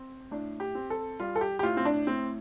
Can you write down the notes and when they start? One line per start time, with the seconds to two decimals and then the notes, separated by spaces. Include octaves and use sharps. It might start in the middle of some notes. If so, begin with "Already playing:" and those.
Already playing: C4
0.31 A2 D4
0.60 G4
0.75 C4
0.90 A4
1.20 G3 F4
1.36 A4
1.41 G4
1.59 G4
1.63 A2 F4
1.77 C4
1.85 D4
2.07 A2 C4